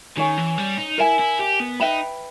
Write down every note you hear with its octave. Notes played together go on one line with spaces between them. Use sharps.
D#3 C#4 G#4 C#5 G#5
E3
G3
D#4
E4 A#4 E5 G#5
E4
G4
B3
D#4 B4 E5 G5 B5